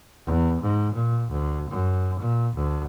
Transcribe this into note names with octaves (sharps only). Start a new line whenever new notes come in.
E2
G#2
A#2
D2
F#2
A#2
D2